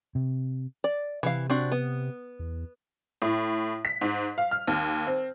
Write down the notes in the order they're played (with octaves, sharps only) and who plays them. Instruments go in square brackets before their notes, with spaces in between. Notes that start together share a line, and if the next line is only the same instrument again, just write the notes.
[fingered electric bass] C3
[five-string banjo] D5
[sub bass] C3 [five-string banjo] E3 F5
[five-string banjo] C4 D4 F#4
B3
[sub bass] E2
[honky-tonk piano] A2
B6
G#2
F5
F6
D#2
C4